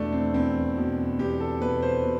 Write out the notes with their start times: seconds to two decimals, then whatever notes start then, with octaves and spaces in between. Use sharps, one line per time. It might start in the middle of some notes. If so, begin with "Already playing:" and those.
Already playing: E2 B2 A3 D4
0.13 C4
0.34 E2 C4
0.77 B2
1.19 E2 G4
1.40 A4
1.60 B2 B4
1.82 C5
2.03 B2